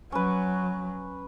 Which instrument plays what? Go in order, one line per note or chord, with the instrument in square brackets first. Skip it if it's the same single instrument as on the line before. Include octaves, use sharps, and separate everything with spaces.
[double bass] F#3 [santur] C#4 B4